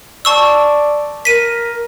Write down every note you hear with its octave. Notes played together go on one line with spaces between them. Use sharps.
D5 A5 C#6 E6
A#4 B6 D#7